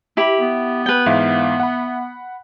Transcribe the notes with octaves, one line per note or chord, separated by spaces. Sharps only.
E4 G4 B5
B3
B4 G5
G#2 E3 E4 F5
F#5 B5